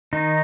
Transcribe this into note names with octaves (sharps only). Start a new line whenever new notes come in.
D#3 D#4